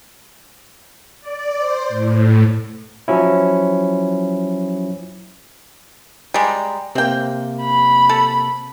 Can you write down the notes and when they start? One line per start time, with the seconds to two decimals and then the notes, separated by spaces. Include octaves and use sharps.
1.21 D5
1.58 C5
1.89 A2
3.08 F3 F#3 C#4 E4
6.34 G3 G#3 G5 A#5
6.95 C3 A#3 C4 G5
7.62 B5
8.09 A4